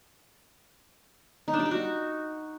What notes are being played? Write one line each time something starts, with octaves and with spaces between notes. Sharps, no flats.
D#4
D4
G3
D#4
F#4